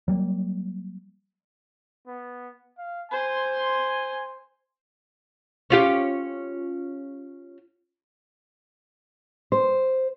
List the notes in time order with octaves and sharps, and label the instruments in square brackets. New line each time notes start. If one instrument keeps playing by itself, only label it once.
[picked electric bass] F#3 G3 A#3
[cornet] B3
F5
[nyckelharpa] C5 C6 [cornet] G#5
[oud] C#4 F4 G4
[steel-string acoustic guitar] C5